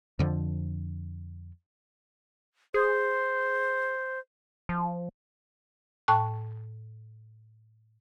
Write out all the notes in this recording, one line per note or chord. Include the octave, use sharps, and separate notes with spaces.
F2 D3 F3
G#4 C5
F3
A2 G5 A5 C#6 F#6